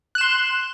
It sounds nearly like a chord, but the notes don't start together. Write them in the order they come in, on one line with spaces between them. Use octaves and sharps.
F#6 E7 C6